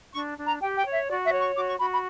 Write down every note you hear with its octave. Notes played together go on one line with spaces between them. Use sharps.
D4 C#6
D4
A#5
G4 G5
G5
C#5
E5
F#4 D5
E5
C#5
C#6
F#4 D6
C#6
F#4 B5
B5